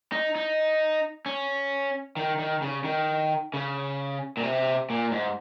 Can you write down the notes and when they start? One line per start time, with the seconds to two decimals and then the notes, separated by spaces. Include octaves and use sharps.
0.12 D#4
0.36 D#4
1.26 C#4
2.17 D#3
2.39 D#3
2.62 C#3
2.84 D#3
3.54 C#3
4.37 A#2
4.43 C3
4.90 A#2
5.11 G#2